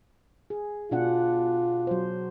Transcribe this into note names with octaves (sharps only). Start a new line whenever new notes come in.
G#4
B2 D4 F4 F#5
F#3 C5